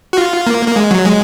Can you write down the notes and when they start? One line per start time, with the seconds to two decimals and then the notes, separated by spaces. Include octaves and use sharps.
0.13 F#4
0.18 F4
0.47 A#3
0.68 A#3
0.76 G#3
0.91 F#3
1.06 G#3